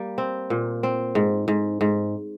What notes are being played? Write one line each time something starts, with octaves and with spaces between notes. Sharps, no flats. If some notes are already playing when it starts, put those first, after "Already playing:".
Already playing: G3 A#3
C4
A#2
C4
G#2
G#2
G#2